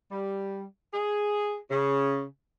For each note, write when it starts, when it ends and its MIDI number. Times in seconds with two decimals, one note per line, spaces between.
0.12 0.63 55
0.94 1.56 68
1.71 2.23 49